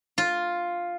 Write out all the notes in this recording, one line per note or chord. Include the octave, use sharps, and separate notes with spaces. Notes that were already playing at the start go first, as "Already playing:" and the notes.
F4